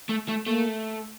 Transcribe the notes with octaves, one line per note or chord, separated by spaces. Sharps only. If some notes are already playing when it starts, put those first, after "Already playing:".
A3
A3
A3 A#3